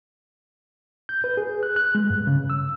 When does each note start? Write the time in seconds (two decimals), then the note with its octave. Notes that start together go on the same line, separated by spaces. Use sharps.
1.09 G6
1.24 B4
1.37 G#4
1.63 F#6
1.76 F#6
1.95 G#3
2.10 G2
2.27 C#3
2.50 E6